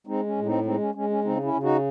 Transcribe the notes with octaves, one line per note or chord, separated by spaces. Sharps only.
G#3 C4 D#4
C#4
A2
C4 D#4
G#3 C4 D#4
C#4
G#3 C#4
C#4
C#3 C4 D#4
C#4 E4
C#3
D#4 F#4